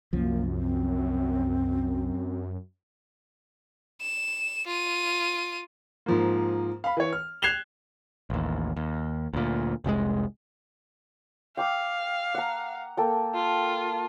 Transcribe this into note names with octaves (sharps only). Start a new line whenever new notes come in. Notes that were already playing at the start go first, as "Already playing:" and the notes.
C2 F#2 F3 A#3
C4
E7
F4 D#7
G#2 F3 A#3
F5 B5
E3 C#5
F6
F#6 G#6 C7 E7 F7 G7
A1 D#2
D#2
D2 A#2
F1 C2 A2 G#3
F5 G5 D6 E6
F#5 A#5
A#3 A4 G5
F4